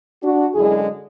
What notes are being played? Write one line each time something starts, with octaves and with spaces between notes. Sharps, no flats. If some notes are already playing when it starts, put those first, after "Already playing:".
D4 F#4
F#2 D3 G#3 E4 G#4